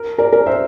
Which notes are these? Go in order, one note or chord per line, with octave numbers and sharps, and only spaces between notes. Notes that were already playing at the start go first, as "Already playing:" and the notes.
Already playing: A#4
A#4 D5
A#4 D5
C5 E5